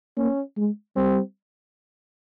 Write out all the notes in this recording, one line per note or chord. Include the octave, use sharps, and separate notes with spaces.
A#3 C#4
G#3
G3 C4